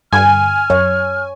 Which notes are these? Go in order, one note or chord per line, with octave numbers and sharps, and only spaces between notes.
G2 D3 G#5 F6
F#2 C#5